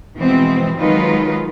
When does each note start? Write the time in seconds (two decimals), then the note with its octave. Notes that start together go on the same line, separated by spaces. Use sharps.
0.17 B2 E3 F3 G#3 C4
0.78 D#3 F#3 G#3 D#4 F4 B4